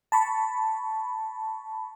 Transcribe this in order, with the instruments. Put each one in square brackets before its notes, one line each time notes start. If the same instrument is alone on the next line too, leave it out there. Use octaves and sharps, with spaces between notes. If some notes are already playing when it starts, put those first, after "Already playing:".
[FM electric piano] A5 B5 C#6